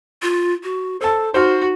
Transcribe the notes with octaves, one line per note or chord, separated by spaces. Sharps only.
F4
F#4
A4 C5 A5
D#4 F#4 C5 F6